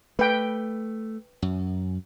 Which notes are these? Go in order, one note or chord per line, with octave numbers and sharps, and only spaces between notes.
A3 B4 G5
F#2